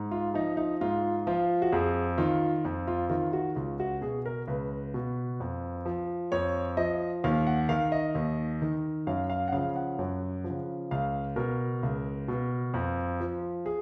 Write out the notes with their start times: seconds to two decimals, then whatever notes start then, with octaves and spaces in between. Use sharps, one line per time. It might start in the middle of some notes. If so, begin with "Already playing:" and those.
Already playing: G#2
0.11 F4
0.34 F3 D#4
0.57 D#4
0.81 G#2 F4
1.27 F3 F4
1.62 F#4
1.72 F2 G#4
2.18 D#3 F4
2.65 F2
2.87 F4
3.10 D#3 F4
3.33 F#4
3.56 C#2 F4
3.80 F#4
4.01 B2 G#4
4.26 A#4
4.48 C#2 B4
4.94 B2
5.40 F2
5.85 F3
6.32 F2 C#5
6.77 F3 D#5
7.24 D#2 F5
7.47 F#5
7.69 D#3 F5
7.92 D#5
8.15 D#2
8.62 D#3
9.07 F#2 F5
9.30 F5
9.48 F#5
9.52 C#3 F3 F5
9.76 F#5
9.99 F#2
10.44 F3
10.50 C#3
10.91 C#2 F5
11.36 B2 A#4
11.83 C#2
12.28 B2
12.74 F2
13.20 F3
13.66 G#4